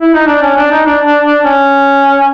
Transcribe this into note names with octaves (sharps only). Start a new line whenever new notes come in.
E4
D#4
D4
C#4
D4
D#4
D4
D4
D4
C#4